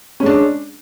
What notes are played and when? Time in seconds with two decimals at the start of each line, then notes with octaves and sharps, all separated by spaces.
0.20 C#4
0.23 G#3
0.26 D4